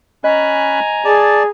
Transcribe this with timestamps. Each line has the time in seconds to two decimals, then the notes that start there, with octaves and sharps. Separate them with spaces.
0.24 C#4 D#5 G#5 A#5 B5 F#6
1.05 G#4 D5 A5